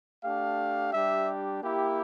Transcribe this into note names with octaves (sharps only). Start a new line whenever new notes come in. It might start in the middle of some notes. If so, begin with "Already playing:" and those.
A3 D4 G4 F5
G3 D4 G4 E5
A#3 E4 G4